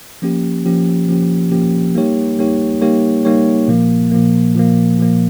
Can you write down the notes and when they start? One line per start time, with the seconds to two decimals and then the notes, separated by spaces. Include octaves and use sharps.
0.22 F3 A#3 C#4 G4
0.65 F3 A#3 C#4 G4
1.09 F3 A#3 C#4 G4
1.52 F3 A#3 C#4 G4
1.95 G3 A#3 D#4 G4 C#5
2.39 G3 A#3 D#4 G4 C#5
2.82 G3 A#3 D#4 G4 C#5
3.25 G3 A#3 D#4 G4 C#5
3.68 A#2 F3 A#3
4.11 A#2 F3 A#3
4.55 A#2 F3 A#3
4.98 A#2 F3 A#3